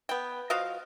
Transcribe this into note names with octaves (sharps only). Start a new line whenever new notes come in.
B3 G5
F3 F#4 D#5 F5